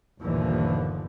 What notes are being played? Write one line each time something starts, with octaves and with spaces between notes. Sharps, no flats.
G1 D#2 A#2 D3 E3 F3